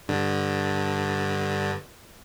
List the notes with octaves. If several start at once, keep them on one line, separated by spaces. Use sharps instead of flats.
G2 D3